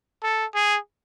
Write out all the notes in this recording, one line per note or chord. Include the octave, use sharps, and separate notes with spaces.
A4
G#4